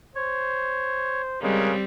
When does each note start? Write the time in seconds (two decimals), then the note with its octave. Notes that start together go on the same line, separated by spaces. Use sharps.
0.16 C5 C#5
1.42 C#3 G3 G#3 C4 A#4